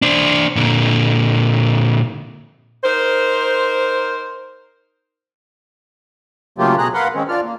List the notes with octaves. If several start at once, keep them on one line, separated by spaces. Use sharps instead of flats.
D4 C5
A#2 D3
D#4 A#4 C5
C#3 F#3 A3 A#3 F4 G4
B2 G#4 A#5 F#6
A#4 B4 F5 F#5 B5 C6
D#3 G#3 C4 C#4
D4 F4 D5 F6
A#3